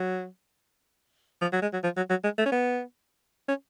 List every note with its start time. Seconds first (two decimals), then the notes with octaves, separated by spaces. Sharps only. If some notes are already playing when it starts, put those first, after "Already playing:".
Already playing: F#3
1.41 F3
1.53 F#3
1.62 G#3
1.73 F#3
1.84 F3
1.97 F#3
2.10 F#3
2.24 G#3
2.38 A3
2.46 C#4
2.52 B3
3.48 C#4